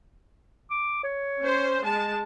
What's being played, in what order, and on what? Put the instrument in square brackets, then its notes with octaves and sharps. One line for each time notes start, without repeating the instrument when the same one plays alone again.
[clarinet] D6
C#5
[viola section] C#4 C5
G#3 A5